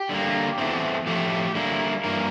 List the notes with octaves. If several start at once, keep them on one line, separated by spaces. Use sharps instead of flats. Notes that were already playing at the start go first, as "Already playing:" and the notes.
Already playing: G4
D3 G3 A#3
E2 E3 A3 C4
A2 F3 A3 G4
D3 G3 A#3 E4
G2 E3 A#3 A#4